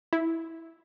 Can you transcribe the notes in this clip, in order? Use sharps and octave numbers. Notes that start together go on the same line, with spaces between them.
E4